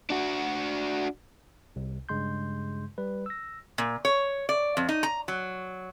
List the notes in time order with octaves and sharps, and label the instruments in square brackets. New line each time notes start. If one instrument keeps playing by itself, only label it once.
[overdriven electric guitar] D4 F#4
[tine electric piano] C2 C3
G2 C#3 G#3 C6 G6
G3 B4
E6 A#6
[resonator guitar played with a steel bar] A#2
C#5
D5
F2
D#4
A#5
F#3